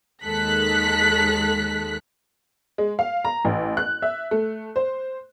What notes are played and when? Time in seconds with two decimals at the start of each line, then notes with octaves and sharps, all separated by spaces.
0.24 D#2 D#3 G#3 A4 F#6 B6
2.78 G#3
2.99 F5
3.25 A#5
3.45 A1
3.77 F#6
4.02 E5
4.31 A3
4.76 C5